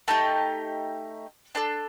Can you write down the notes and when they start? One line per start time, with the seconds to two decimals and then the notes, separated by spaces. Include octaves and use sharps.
0.08 A3 D#4 G4 A5
1.55 D4 A4 A5